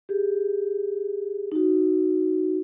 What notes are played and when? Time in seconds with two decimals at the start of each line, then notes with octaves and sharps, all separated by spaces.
0.09 G4 G#4
1.52 D#4 F#4